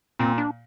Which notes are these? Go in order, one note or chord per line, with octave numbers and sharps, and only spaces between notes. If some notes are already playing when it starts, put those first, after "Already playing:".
A#2 C4
D4